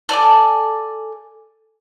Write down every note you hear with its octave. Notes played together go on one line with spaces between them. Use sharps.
A4 D5 G#5 D6